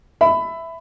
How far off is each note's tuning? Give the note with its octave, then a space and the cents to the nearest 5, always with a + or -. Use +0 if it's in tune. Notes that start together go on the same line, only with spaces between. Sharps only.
E5 +0 B5 +20